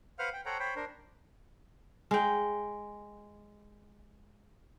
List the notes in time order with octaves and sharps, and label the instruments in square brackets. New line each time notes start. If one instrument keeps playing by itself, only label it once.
[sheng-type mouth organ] B4 C5 F5 F#5 F6
G5
A4 C5 C#5 F#5 G5 A#5
C5 C#5 G5 B5
D4 A#4 C5
[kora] G#3 G5